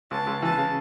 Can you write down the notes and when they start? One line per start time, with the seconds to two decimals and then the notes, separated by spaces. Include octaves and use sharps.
0.11 C#2 A5
0.27 C#2
0.42 E3 A5
0.58 C#3